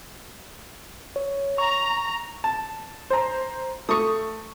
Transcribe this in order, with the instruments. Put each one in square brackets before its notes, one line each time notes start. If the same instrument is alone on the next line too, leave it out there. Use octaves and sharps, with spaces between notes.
[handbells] C#5
[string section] A#5 [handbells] C#6
[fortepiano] A5
[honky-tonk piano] C5 A#5
[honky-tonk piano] A3 [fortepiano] C#6 D#6